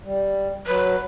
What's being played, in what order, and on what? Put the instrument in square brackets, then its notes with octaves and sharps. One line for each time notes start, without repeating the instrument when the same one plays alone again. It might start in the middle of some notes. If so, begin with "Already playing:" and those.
[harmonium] G3
[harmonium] F#3 [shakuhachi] B4